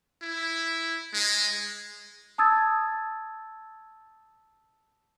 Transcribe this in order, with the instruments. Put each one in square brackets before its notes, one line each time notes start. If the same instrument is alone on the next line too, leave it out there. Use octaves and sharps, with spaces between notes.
[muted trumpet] E4
G#3
[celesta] A5 D#6 E6 G#6 A6